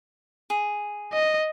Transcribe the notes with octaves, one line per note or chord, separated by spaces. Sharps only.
G#4
D#5